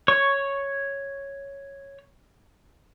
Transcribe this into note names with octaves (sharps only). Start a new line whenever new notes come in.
C#5 C#6